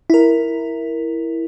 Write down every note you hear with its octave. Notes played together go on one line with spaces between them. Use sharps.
E4 A#4